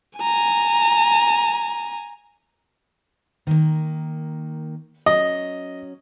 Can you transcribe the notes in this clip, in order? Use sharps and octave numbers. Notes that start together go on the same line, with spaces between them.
G#5 A#5
D#3 A#3
F#3 C#4 D#5